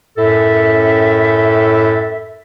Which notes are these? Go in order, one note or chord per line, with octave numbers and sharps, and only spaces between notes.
F#2 A2 A4 E5